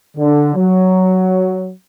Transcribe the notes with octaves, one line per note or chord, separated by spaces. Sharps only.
D3
F#3